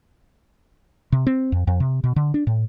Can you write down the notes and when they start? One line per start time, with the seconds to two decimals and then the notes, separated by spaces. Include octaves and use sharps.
1.12 C3
1.27 C4
1.52 F2
1.67 F2
1.80 C3
2.04 B2
2.16 D3
2.34 D4
2.47 A2